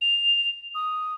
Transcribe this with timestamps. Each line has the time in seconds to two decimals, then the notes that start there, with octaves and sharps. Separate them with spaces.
0.01 F7
0.75 D#6